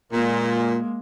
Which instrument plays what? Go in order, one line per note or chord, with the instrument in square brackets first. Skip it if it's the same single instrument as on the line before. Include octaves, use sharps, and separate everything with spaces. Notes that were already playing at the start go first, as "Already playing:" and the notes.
[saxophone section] A#2 [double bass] G#3 A#3